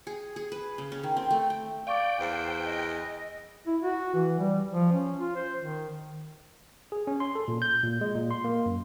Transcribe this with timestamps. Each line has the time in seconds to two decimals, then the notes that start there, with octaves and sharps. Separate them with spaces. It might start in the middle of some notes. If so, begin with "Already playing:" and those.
0.07 G#4
0.36 G#4
0.52 B4
0.78 C#3
0.92 C#4
1.03 D#3
1.17 C4
1.31 A3
1.50 G5
1.87 D5 F5 G5 C#6 D6
2.20 E2 C5
2.66 D#5
3.67 E4
3.82 F#4
4.14 E3
4.39 G3
4.71 F3
4.92 C#4
5.19 F4
5.36 C5
5.59 D#3
6.92 G#4
7.07 C#4
7.20 C6
7.35 A4
7.48 A#2
7.62 G6
7.83 A#2
8.01 G#3
8.15 A#2
8.31 C6
8.44 A#3
8.66 F#2